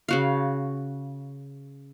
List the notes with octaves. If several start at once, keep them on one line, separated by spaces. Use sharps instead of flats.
C#3 F#4 F5